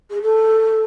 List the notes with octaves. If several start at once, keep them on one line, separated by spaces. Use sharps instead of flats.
G#4
A4